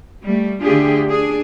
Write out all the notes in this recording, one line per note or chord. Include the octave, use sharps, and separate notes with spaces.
G3 A3
D3 A3 D4 F4 G4 G#4
D4 G#4